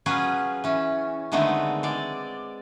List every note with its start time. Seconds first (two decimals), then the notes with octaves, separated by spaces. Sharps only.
0.06 F#3 B3 C#4 F4 G#4 B4
0.64 E3 C#4
1.32 D3 D#3 G#3 A3 B3 C4
1.83 G#3 D5